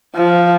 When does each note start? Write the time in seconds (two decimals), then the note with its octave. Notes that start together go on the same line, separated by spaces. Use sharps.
0.15 F3